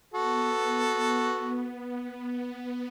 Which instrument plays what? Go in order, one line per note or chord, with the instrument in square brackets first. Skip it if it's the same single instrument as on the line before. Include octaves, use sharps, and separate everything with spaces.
[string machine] B3 [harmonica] F#4 A4